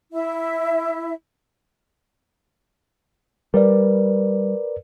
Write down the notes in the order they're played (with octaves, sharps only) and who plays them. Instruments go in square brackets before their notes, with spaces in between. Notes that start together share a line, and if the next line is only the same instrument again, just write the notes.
[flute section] E4 E5
[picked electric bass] G3 [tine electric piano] A#4 B4 D5